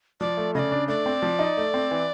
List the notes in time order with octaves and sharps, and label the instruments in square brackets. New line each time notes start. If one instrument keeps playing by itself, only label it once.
[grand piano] F3 [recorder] D5
[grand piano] A3
[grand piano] C#3 [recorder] D5 D#5
[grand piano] D4
[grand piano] A3 [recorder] D5
[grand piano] C4
F3
D#4
A3
C4
E3